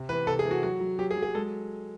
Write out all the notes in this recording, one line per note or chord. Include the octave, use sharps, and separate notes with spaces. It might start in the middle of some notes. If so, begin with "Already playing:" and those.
Already playing: C3
E3 B4
C3 A4
G#4
E3
F#4
F#3 F#4
F#3
F#3 G4
G#4
F#3
G#4
G#3 A4